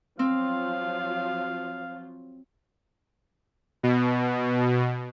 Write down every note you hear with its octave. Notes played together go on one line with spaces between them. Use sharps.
F3 F#3 C4 F4 F5
B2